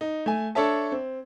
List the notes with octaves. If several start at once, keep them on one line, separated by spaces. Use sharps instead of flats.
D#4
A3 G#5
D4 A4 C#5 E5 A5
C4